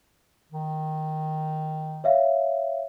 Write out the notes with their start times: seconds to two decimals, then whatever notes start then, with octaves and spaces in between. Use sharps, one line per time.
0.53 D#3
2.04 C#5 E5 F5